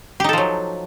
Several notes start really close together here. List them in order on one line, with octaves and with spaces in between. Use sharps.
G4 D#4 A4 F3 F#3